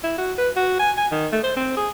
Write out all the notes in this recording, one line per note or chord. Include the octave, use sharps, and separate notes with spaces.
E4
F#4
B4
F#4
G#5
G#5
D#3
A3
C5
C4
G#4